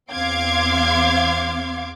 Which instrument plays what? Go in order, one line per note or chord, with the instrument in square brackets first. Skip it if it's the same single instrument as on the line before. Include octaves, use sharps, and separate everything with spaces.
[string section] E2 C4 F5 C6 D6 G#6